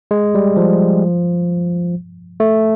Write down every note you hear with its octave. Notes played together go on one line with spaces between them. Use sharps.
G#3
G3
F3
A3